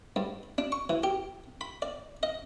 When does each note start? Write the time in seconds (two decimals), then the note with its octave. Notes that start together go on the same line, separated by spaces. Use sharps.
0.16 G2
0.58 D4
0.72 C#6
0.89 E3
1.03 G4
1.61 B5
1.82 D5
2.23 D#5